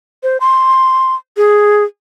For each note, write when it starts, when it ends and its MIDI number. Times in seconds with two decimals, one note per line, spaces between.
0.23 0.37 72
0.40 1.15 84
1.37 1.84 68